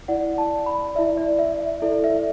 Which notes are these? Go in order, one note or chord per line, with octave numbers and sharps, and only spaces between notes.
E4 D5 F#5
A5
B5
E4 D5 E5
D5
E5
E5
E4 A4 D5
E5